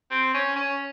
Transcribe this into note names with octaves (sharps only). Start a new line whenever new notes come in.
C4
C#4
C#4